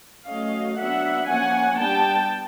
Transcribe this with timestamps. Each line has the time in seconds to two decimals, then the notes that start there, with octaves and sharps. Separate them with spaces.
0.27 F#3 A3 C#4 D#5 F5
0.77 F#3 B3 D4 E5 F#5
1.27 F3 A#3 C#4 F#5 G#5
1.78 G3 B3 D4 G5 A5